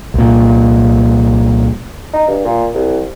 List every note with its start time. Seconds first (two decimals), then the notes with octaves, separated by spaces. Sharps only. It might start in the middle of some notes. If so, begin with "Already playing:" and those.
0.14 C2 A#2
2.13 D#4
2.28 G2
2.44 A#2
2.74 C2